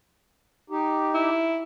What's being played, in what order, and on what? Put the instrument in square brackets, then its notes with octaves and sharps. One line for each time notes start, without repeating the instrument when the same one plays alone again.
[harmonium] D#4 G4
[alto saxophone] E4